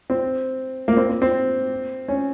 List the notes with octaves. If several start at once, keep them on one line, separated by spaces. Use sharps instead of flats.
C4
A#3
C4
C4
C4
C#4